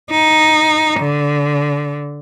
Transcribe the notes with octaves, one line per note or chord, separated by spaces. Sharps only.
D#4
D3